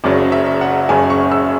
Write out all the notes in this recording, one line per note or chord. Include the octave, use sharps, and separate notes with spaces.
F#1 F#2 C#3 F#3 D5
E5
F#5
F#1 F#2 C#3 F#3 G#5
C#6
E6